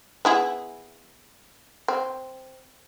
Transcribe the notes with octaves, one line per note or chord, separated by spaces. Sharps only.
B3 E4 G#4
C4